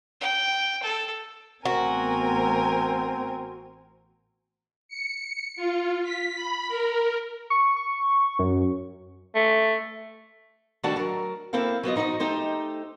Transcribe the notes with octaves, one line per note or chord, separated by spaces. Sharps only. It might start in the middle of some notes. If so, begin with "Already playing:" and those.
G5
A4
A1 A3 B3 C4 F#4 A#4 G#5
C#7
F4
B6
B5
A#4
C#6
C#6
F#2
A3
D#3 G3 A3 D4 F#4 A5
F#3 A#4
A#3 C4 E4 A4 F5
F#3 B3 F4 D#5
F3 D#4 E4 F#4 D#5
A3 D#4 G4 C5